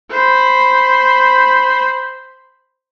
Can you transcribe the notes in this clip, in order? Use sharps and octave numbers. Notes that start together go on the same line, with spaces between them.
C5 B5